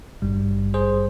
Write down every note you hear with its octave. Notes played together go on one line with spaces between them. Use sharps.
G#1 G2 G3
G#4 C5